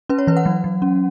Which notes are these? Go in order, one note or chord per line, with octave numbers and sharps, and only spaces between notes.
C#4 B4
C#5
E3 B4
F#5
F#3
F#3
C#4